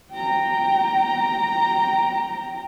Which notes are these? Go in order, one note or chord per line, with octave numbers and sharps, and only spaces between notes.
G5 A#5